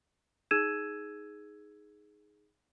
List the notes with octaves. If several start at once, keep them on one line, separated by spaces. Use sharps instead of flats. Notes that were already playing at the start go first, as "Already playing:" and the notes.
D#4 G#4 E6 G#6 D#7 E7